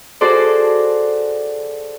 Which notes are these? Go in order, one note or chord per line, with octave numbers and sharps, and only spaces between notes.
F#4 G#4 A4 C5 D5